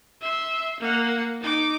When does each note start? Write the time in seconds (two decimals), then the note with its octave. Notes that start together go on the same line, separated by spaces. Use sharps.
0.21 E5 C6
0.80 A#3 F#5
1.41 D#4 D6